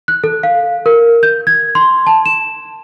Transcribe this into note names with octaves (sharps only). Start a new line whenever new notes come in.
F#6
A4
F5
A#4
G6
G#6
C6
A5
E7